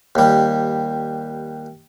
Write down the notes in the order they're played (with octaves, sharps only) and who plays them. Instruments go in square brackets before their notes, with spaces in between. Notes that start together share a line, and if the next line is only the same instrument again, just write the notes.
[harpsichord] D#2 G3